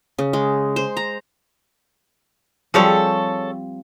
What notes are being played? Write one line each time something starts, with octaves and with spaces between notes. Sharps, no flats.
C#3
G#3
C5
A#5
F3 G3 C4 G#4 A4 C#5